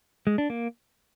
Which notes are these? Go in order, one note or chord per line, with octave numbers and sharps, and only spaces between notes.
G#3
D4
A#3